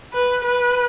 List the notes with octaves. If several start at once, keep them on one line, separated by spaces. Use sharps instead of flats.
B4
B4